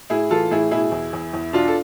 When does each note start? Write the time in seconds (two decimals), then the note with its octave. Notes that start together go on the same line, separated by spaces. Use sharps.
0.10 A2 E4 G#4
0.30 E3 F4 A4
0.51 A2 E4 G#4
0.71 B2 E4 G#4
0.92 E2
1.13 E2
1.33 E2
1.53 B2 D4 F4
1.68 A4